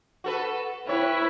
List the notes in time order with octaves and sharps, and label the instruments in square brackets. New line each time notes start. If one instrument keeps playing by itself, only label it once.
[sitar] F#4 A4 B4
[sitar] C3 C#5 [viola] E4 B4